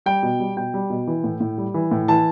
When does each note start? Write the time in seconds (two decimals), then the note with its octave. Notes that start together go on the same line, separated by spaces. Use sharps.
0.06 G3 G5
0.23 B2
0.39 G3
0.57 B2 G5
0.74 G3
0.90 B2
1.07 E3
1.24 A2
1.40 A2
1.58 G3
1.74 E3
1.91 A2
2.08 E3 A5